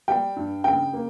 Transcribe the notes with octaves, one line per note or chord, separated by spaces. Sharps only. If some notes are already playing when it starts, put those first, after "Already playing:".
G3 G5
G2
C#3 G5
A#3